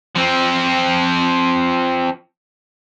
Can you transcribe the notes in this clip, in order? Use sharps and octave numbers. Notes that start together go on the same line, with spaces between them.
F3 C4